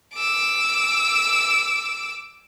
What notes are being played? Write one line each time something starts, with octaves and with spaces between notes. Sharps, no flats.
D6 E6